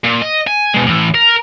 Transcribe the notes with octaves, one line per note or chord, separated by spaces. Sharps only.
A#2
D#5
G#5
B2 G#3
A2 E3
A#4